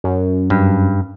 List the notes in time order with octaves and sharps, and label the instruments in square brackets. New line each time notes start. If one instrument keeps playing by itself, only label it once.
[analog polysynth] F#2
[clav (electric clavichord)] G2